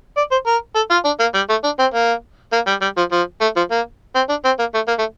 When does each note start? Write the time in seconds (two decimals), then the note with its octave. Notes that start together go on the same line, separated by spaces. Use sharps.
0.17 D5
0.31 C5
0.47 A#4
0.75 A4
0.91 F4
1.05 D4
1.20 A#3
1.35 G3
1.50 A3
1.64 D4
1.79 C4
1.94 A#3
2.53 A#3
2.67 G3
2.81 G3
2.97 F3
3.12 F3
3.41 A3
3.56 F3
3.71 A#3
4.15 C4
4.29 D4
4.45 C4
4.59 A#3
4.74 A3
4.88 A#3
4.99 A3